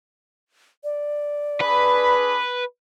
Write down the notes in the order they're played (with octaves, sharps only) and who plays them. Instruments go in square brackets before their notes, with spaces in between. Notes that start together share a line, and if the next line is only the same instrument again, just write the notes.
[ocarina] D5
[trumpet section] D4 G#4 B5 [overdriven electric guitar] B4